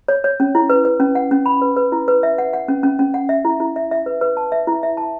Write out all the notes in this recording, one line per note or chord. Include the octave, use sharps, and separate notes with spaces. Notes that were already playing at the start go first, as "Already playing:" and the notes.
C#5
C#5
C#4
E4
B4
B4
C#4
F#5
C#4
B5
B4
B4
E4
B4
E5
F#5
F#5
C#4
C#4
C#4
F#5
E5
E4
E4
E5
E5
B4
B4
A5
E5
E4
E5
A5